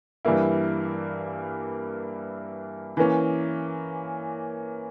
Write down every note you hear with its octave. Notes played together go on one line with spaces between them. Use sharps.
G2 E3 G3 A#3 E4
E3 A#3 C#4